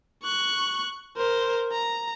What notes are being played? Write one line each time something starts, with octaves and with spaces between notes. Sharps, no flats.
C#6 F#6
A#4 C5
A#5